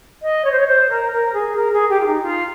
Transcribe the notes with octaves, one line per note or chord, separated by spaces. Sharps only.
D#5
C#5
C5
C#5
C5
A#4
A#4
G#4
A#4
G#4
G4
F4
D#4
F4